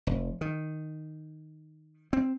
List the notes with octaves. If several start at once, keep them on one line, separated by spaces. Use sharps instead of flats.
F1
D#3
C4